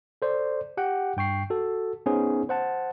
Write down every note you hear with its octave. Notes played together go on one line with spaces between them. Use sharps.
A4 C5 D5
G4 F#5 G5
G2 G5 C#6 C7
F#4 A4
B3 C#4 D#4 G#4 C5
C5 F#5 A5